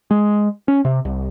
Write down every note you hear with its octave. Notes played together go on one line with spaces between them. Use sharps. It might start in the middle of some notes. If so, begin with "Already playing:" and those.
G#3
C#4
C3
C2